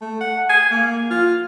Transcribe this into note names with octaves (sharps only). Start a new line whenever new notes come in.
A3
F#5
G#5
A#3
F4